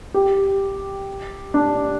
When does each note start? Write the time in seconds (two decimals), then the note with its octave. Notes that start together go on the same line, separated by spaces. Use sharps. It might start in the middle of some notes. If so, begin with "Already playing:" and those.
0.14 G4
1.54 D4